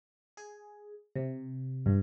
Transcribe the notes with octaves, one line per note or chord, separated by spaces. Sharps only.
G#4
C3
G2